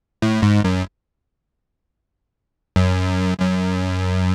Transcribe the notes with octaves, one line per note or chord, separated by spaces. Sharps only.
A2
G#2
F#2
F#2
F#2